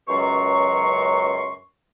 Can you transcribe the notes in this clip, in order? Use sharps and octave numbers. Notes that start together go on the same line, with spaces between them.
C#2 F#2 B2 F#3 C6 C#6